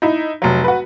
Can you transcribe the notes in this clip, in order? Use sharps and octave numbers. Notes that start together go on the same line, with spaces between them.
D#4 E4
F1 F#3
F#4 B4